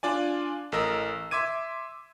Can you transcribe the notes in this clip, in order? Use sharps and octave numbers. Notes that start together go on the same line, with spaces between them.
D4 F4 D5 G#5
A1 A4 A#4 D#5 E6
E5 C6 D6 G#6 D#7